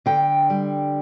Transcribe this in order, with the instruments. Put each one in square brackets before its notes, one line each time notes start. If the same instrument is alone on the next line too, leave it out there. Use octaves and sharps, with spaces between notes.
[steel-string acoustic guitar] D3 G5
G3